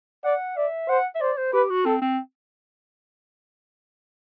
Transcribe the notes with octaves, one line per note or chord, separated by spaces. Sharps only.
D5 F#5
D5 E5
C5 F#5
E5
C5 D5
C5
G4 B4
F#4
C4 A4
C4